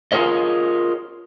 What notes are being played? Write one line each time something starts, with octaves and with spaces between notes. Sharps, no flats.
F4 G#4 A#4 C#5 D#5